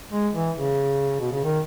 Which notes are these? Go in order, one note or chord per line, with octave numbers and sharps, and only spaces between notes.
G#3
E3
C#3
B2
C#3
D#3